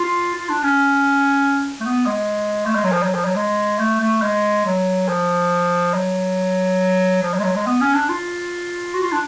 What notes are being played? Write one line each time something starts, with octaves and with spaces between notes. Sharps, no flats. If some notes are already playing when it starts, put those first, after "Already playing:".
Already playing: F4
F4
D4
C#4
A3
B3
G#3
A3
G#3
F#3
F3
F#3
F3
F#3
G#3
A3
A3
G#3
F#3
F3
F#3
F3
F#3
G#3
F#3
G#3
B3
C#4
D4
F4
F#4
F4
D4